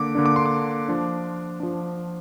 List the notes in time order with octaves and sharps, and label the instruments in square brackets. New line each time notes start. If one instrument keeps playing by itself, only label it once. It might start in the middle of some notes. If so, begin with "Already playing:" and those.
Already playing: [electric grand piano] D3 A#3 D4 D6
D3 A#3 D4
D6
C6
D6
F3 D4
F3 D4